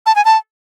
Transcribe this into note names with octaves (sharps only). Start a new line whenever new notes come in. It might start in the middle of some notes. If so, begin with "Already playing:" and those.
A5
G#5
A5